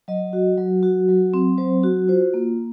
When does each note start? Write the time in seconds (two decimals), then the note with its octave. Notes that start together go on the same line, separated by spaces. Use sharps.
0.08 F#3 D#5
0.33 F#4
0.58 F#3
0.83 F#4
1.09 F#3
1.34 C4
1.58 F#3 C5
1.83 F#4
2.08 F4 C5
2.34 A#3